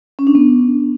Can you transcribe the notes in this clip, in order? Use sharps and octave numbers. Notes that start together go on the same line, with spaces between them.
C#4
D4
B3